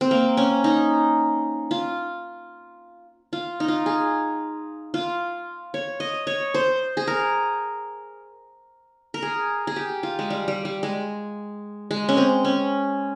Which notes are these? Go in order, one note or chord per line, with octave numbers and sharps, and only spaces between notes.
C4
A#3
C#4
D#4
F4
F4
D#4
F4
G#4
F4
C#5
D#5
C#5
C5
G#4
A#4
A#4
G#4
G#4
G4
F4
G#3
G3
G3
G3
G#3
G#3
C#4
C4
C#4